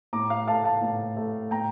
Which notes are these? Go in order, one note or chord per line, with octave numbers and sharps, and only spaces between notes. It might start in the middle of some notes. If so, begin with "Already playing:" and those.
A2 A#5 D6
F5
A3 F5 A5
F5 A5
A2
A3
A2 G5 A#5